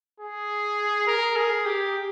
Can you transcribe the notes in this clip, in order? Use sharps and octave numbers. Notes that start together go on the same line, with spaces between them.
G#4
A#4
G#4
G4